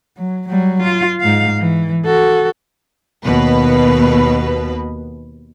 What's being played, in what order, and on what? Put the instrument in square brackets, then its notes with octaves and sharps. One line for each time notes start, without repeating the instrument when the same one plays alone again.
[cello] F#3
F#3 G3
F4
G#2 F5
E3
F#4 A4
[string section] D#2 B2 B4